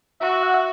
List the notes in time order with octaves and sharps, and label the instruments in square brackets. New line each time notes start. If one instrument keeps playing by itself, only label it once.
[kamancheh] F#4 [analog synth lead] E5
[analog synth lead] E5
F#5
E5